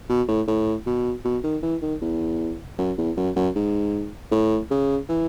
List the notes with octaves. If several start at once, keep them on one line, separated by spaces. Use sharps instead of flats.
B2
A2
A2
B2
B2
D#3
E3
D#3
E2
F#2
E2
F#2
F#2
G#2
A2
C#3
E3